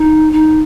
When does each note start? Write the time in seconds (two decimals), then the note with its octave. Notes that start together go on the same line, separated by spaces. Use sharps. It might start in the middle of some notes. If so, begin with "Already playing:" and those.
Already playing: D#4
0.33 D#4